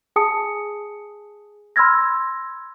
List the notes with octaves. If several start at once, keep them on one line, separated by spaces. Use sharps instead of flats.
G#4 G#5 A5 D#6 C#7
B5 C6 E6 F6 G#6 A#6